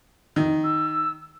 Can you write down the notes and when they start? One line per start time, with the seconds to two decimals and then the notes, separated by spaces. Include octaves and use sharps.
0.36 D#3
0.64 E6